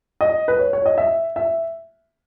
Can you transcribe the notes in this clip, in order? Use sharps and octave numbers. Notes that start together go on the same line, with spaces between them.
D#5
B4
C#5
C#5
D#5
E5
E5